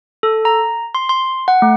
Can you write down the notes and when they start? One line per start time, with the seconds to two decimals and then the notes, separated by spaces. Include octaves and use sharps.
0.23 A4
0.45 A#5
0.95 C6
1.09 C6
1.48 F#5
1.62 A3